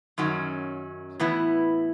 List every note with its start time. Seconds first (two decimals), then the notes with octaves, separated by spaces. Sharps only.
0.18 F#2 D#3 F#3 C#4
1.20 A2 E3 B3 E4